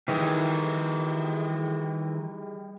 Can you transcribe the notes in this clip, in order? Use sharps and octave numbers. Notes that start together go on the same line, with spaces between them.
D#3 E3 G3 G4 G#4